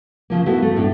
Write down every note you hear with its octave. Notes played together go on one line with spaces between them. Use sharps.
C#3 F3 A#3
A3 B3 E4 F#4
A3
A2 D4